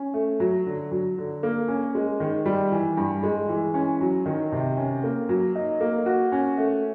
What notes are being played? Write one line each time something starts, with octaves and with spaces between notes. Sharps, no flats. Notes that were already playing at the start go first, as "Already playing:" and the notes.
Already playing: C#4
A3
F#3
D3
F#3
D3
A#3
C#4
G#3
D#3
G3
E3
G2
G#3
E3
C#4
F#3
D#3
C3
C#4
A#3
F#3
D#4
A#3
F#4
C#4
A3